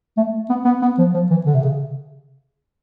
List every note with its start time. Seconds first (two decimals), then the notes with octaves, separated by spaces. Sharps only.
0.17 A3
0.49 B3
0.65 B3
0.82 B3
0.98 F3
1.14 F3
1.30 E3
1.46 D3
1.54 C3
1.63 C#3